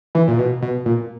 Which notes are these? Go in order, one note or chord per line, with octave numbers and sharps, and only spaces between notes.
E3
A#2
B2
B2
A#2